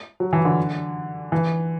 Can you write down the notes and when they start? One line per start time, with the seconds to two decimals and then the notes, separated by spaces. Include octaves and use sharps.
0.20 F#3
0.33 E3
0.45 D3
1.32 E3